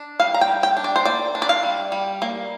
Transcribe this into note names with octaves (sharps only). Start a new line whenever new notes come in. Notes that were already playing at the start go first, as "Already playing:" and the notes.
Already playing: D4
G3 F5
A#5
G5
G3
G5
D4
D5
C5
A#3 D5
D4
D5
F5
G3
G3
A#3